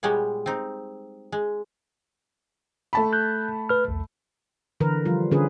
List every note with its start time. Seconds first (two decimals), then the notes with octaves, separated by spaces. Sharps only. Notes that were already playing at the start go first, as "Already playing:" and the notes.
0.03 A#2 G3 G#3 B3 C#5
0.46 C4 D#4
1.32 G#3
2.93 A3 A5 B5
3.13 F#6 G6
3.69 B4 F6
3.88 B1 E2
4.80 D3 E3 A#4 B4
5.05 F3 G3 F4
5.31 D3 C#4 F4 G#4 B4